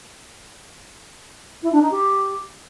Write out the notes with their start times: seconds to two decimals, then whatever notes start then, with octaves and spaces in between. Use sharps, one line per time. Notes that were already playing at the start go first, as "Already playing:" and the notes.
1.63 E4
1.72 D4
1.82 D#4
1.91 G4